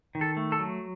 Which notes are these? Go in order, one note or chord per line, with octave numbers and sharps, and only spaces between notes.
D#3
A4
A3
A4
F#3